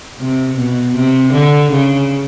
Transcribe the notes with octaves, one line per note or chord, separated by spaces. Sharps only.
C3
B2
C3
D3
C#3